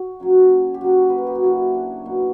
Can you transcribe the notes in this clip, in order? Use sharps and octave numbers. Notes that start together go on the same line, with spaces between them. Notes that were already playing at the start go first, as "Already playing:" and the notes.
Already playing: F#4
F#2 C#3 F#3 A#3
G4
F#2 C#3 F#3 A#3 F#4
B4
A#4
G4
F#4
F#2 C#3 F#3 A#3 E4
D4
B2 F#3 A#3